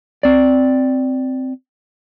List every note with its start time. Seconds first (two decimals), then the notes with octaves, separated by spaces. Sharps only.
0.23 C4 D5